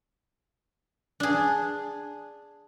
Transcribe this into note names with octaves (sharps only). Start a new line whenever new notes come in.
D4 G#4